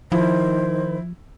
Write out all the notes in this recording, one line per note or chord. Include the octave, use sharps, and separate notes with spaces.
D#3 F3 E4 C5